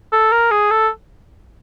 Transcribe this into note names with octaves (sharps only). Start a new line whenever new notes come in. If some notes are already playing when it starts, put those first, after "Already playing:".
A4
A#4
G#4
A4